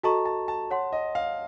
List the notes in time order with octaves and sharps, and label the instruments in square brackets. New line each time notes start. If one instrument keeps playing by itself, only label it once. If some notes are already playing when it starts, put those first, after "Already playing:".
[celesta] F#4 A4 D#5 A#5 C#6 [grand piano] A5
[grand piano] A5
A5
[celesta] C#5 F#5 C6
[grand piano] D#5
F5